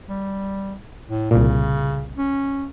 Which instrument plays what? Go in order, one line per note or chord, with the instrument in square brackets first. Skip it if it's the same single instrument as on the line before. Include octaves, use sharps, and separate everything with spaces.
[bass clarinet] G3
A2
[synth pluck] C2 A#2 [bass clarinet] C#3
[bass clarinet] C#4